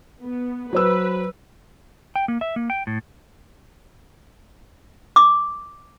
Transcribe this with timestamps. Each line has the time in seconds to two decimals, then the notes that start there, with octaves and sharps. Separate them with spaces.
0.23 B3
0.73 F#3 B4 C5 E6
2.16 G5
2.28 A#3
2.41 E5
2.56 A#3
2.70 G5
2.87 A2
5.16 D6